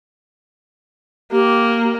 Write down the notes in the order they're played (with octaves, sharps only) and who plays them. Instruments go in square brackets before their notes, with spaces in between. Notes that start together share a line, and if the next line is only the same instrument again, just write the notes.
[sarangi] A#3 [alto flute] G4